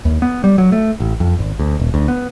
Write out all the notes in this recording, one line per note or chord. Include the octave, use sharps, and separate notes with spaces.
D#2
B3
G3
F#3
A3
A1
F2
G#1
D2
D#1
D2
B3